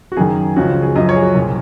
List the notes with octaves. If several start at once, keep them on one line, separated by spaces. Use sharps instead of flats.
F#4
F#2 D#3 G#4
C#2 C#3 F3 F#4
G#4
F#2 C#3 F3 D#5
C#5
G#4
F#4
C2 A#2 F3 G#4